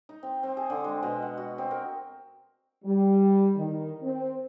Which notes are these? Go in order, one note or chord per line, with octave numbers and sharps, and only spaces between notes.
D#4
C4
C4
G#4
D3
G#3
B2
F#5
F#4
C4
A#4
G3
D#3
C4